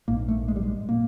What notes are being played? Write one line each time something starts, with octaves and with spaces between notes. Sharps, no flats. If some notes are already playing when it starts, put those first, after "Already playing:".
A#1 G#2 A#3
A3
G#3
G3
G#3
A#2 A#3